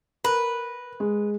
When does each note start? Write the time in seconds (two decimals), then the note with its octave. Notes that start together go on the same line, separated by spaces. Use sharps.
0.24 A#4 B4
1.00 G#3